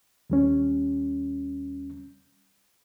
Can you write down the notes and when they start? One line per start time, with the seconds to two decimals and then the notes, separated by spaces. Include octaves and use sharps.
0.30 D#2 G3 C#4